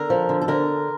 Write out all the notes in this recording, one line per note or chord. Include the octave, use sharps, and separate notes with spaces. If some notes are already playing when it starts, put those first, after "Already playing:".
Already playing: D3 A#4
F3
D3
A4
D3 A#4